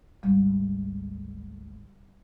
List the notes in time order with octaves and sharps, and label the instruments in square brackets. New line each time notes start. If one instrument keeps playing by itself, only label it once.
[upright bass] G#1 D2 [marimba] G3